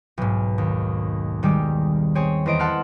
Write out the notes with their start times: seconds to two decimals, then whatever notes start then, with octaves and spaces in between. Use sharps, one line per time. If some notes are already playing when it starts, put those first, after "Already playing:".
0.18 B1 G#2
0.58 D#2
1.43 D#3 G3 G#3 G4
2.15 C4 G#4 C#5
2.46 E2 C5 D#5 D7
2.60 A4 F#5 A5 C6 F6